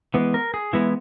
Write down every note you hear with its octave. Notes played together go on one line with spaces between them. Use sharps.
E3 G#3 B3
A#4
G#4
E3 G#3 B3 E4